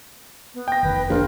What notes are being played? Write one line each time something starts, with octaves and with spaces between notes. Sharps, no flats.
B3
G5 A#6
F1 D#3 B4
A#1 F4